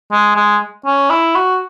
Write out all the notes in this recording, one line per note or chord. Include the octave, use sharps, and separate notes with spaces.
G#3
G#3
C#4
E4
F#4